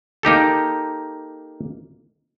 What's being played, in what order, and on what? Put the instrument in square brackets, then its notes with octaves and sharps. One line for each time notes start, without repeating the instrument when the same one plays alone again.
[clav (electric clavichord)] A#3 D#4 G4 A4